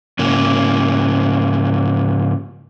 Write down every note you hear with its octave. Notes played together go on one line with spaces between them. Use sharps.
G#2 C#3 A#3